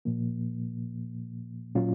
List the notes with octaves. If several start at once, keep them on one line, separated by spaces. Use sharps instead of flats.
A#2 F3 A#3
A#2 F#3 C#4 F4